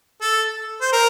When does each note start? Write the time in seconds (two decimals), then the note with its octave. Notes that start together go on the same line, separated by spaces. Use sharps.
0.22 A4
0.81 C5
0.93 A#4